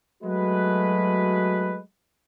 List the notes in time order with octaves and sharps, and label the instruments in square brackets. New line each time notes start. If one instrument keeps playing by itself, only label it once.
[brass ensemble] F#3 G#3 A3 F#4 B4